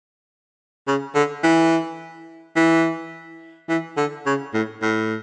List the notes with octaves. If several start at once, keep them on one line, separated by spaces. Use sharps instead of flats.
C#3
D3
E3
E3
E3
D3
C#3
A2
A2